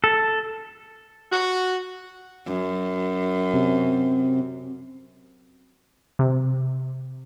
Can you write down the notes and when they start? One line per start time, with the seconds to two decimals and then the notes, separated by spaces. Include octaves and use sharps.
0.04 A4
1.32 F#4
2.46 F#2
3.54 C3
6.19 C3